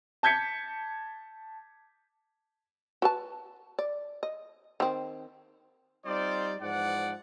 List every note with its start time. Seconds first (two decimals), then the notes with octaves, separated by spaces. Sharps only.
0.23 A5 G6 G#6 B6 C#7
3.02 F#4 B4 A5
3.79 D5
4.23 D#5
4.80 D#3 C4
6.06 G3 C4 D#4 F4 C5 D5
6.60 G#2 E3 F3 D5 F#5